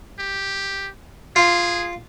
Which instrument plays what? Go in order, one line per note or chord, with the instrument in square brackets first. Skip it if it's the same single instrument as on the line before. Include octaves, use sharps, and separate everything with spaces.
[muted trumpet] G4
[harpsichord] F4 [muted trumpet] G#4